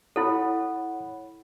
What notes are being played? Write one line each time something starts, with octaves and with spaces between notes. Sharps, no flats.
E4 A4 C#5 F#5 B5